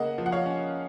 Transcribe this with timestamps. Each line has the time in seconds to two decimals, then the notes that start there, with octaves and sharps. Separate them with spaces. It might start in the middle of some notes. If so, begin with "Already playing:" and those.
Already playing: C#3 A#3 D#5 F#5
0.18 F3
0.26 F#5
0.32 C#5 F5
0.46 C#4